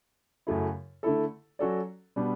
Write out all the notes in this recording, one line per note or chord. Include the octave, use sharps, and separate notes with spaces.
F#2 C#3 F#3 A3 E4
D3 A3 E4 A4
F#3 C#4 F#4 A4 D5
B2 G3 B3 D4 G4